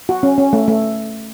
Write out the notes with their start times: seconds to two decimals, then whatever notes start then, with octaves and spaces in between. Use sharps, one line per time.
0.09 F#4
0.23 C#4
0.38 C#4
0.53 A3
0.68 A3